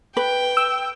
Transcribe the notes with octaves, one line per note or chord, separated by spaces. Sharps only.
B4 G5
E6